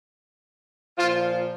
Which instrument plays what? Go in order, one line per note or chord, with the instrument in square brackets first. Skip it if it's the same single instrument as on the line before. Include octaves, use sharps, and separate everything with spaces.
[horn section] A#2 F3 F4